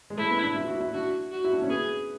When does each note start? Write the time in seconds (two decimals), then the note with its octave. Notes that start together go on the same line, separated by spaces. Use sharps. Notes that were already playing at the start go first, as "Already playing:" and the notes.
0.10 G#3
0.18 A3 E4
0.30 B3
0.43 D4
0.56 E4
0.68 F#4
0.81 E4
0.94 D4 F#4
1.31 F#4
1.44 E4
1.53 D4
1.62 C#4
1.69 B3 G#4